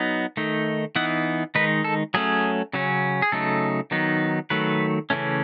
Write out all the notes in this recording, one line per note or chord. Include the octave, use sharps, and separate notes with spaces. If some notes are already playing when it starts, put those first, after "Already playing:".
Already playing: F#3 B3 D#4
D#3 A3 D#4
E3 B3 D#4 F#5
D#3 G#3 D#4 B4
A4
F#3 A3 C#4 G#4
C#3 F#3 C#4
G#4
C#3 F#3 A3 D#4 A4
D#3 F#3 B3 D#4
D#3 F#3 A3 B4
C#3 E3 A3 C#4